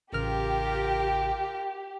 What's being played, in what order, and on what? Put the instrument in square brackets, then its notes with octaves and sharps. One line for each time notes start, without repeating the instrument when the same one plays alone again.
[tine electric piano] A1 C#3 F6 [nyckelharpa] F4 A#4 [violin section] G4